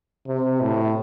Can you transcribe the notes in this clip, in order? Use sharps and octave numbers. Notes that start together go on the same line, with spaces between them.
C3
A2